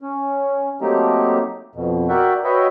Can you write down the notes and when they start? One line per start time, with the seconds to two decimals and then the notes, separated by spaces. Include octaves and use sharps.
0.02 C#4
0.81 F#3 A3 A#3 C4 D#4 G4
1.75 F2 B2
2.09 F#4 A#4 D5 E5 F#5 G5
2.44 F#4 B4 C#5 D#5 E5 G5